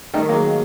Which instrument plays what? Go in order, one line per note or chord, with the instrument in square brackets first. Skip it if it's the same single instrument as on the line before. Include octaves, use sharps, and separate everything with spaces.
[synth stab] D#3 [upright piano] G3 A3
[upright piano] F#3 G#3 [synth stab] A#3